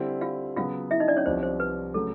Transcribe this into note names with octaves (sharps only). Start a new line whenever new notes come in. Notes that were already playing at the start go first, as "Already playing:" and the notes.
Already playing: D3 G3 C4 E4
F4 F5
C#3 F#3 B3 F4 F5
E4 E5
D#4 D#5
D4 D5
C#4 C#5
C2 C3 F3 C5
C5
B4
C#3 F#3 A3 A4